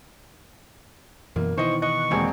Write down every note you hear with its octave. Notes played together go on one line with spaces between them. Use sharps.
F#2 B2 E3 A#3
B2 D#3 E3 D#4 E4 C5 D#5 C#6
D#5 C#6 F#6
E1 G#3 A#3 C4